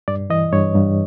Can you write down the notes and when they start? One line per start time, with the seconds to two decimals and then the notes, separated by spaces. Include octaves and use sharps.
0.08 G2 D5
0.30 E3 D#5
0.53 G2 C#5
0.75 G2